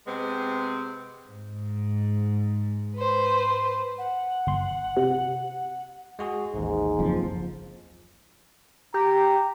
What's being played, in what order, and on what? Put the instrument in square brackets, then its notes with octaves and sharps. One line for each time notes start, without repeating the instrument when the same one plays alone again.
[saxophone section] C3 G#3 B3 C4
[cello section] G#2
[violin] B4 C5
[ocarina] F#5
[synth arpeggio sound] G1 C6
C3
[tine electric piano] G#3 F#4 G#4
[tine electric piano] A1 D#2 [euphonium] G#2
[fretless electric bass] F#1 F2 F3
[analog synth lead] G4 [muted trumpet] A#5